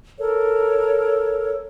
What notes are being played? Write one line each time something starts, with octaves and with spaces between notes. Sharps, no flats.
A4 A#4 C#5